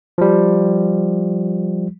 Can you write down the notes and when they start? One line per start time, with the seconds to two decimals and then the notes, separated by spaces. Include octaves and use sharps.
0.18 F3 G3